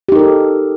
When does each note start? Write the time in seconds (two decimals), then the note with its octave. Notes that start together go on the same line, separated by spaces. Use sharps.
0.09 G4
0.12 D#4
0.16 A#4
0.19 A4